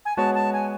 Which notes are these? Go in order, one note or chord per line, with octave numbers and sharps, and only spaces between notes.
G#5
G#3 B3 F#4 C#5 A5
A5
G#5